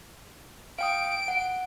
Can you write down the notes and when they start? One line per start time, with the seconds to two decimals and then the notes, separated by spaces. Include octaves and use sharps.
0.79 F5 G5 D#6 D7
1.28 F#5